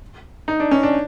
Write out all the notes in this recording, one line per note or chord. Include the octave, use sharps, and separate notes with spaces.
D#4
D4
C#4
D4